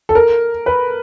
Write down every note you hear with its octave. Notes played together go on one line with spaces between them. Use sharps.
A4
A#4
B4